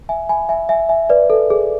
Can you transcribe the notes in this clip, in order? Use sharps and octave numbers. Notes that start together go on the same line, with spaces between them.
E5 G#5
G#5 B5
E5 G#5
E5 G#5
E5 G#5
B4 D5
A4
G#4